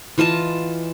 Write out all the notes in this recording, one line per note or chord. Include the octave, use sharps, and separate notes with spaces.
E3 F4 D#5 A5